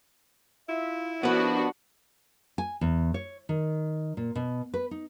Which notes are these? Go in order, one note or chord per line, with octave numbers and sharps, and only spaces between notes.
E4 F4 E5
D#2 F3 B3 D4 F#4 B4
G#5
E2
C#5
D#3
A#2
B2
B4
D#4